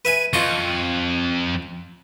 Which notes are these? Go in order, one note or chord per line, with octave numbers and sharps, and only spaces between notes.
B4 E5 G#5
F2 F4 D#5 C#6